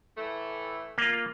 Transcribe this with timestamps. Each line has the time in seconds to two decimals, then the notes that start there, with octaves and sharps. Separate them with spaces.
0.17 A2 E3 A3
0.98 A#3 F4